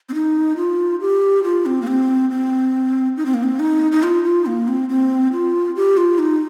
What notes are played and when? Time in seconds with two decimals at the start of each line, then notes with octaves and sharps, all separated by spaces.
0.09 C4
0.14 D#4
0.57 F4
1.01 G4
1.44 F4
1.66 C4
1.82 A#3
1.87 C4
2.30 C4
3.17 D#4
3.26 C4
3.34 A#3
3.43 C4
3.60 D#4
3.92 D#4
4.03 F4
4.24 F4
4.46 A#3
4.68 C4
4.89 C4
5.32 F4
5.76 G4
5.97 F4
6.19 D#4